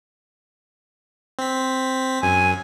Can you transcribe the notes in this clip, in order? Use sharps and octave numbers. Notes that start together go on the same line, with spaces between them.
C4 B6
F#2 G#5